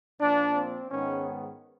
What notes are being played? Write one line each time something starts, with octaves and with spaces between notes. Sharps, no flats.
A#2 F3 A#3 D4
C4
G#2 D#3 G#3 B3 C#4